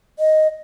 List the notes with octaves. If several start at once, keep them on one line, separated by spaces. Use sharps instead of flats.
D#5